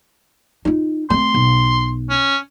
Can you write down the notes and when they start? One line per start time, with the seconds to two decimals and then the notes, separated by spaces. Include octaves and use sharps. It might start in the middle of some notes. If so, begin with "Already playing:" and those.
0.65 D#4 F4
1.10 A3 C4 C6
1.34 B1
2.10 C#4